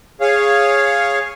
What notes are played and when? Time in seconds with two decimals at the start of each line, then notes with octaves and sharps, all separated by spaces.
0.21 G#4 C#5 F5